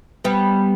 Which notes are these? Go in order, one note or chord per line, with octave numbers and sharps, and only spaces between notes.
G3 B3